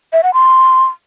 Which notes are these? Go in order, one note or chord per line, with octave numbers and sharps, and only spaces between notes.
E5
F#5
C6